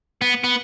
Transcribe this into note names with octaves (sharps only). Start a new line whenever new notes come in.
B3
B3